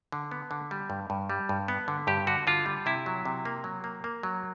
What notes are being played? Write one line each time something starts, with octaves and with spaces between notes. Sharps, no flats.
D3
B3
D3
G3
G2
G2
G3
G2
B3
D3
G2 G4
D3 F#4
D3 F4
G3
C3 E4
F#3
C3
A#3
F#3
A#3
A#3
F#3